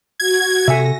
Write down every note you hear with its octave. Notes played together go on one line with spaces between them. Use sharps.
F#4 G#6
C3 A4 E5 G#5 A#6